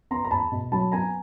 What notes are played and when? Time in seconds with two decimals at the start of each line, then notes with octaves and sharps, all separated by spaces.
0.11 B3 A#5 C6
0.24 A#5
0.31 E2 A5 B5
0.52 B2
0.72 F#3 A5 B5
0.92 B3 G#5 A#5